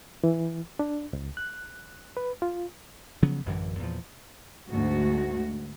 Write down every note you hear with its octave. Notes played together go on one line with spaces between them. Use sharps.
E3
D4
C#2
F#6
B4
F4
C#3 F3 F#3 B3
A1 F#2 D3 E3
E2 A#2 F3
D2 G#2 F#4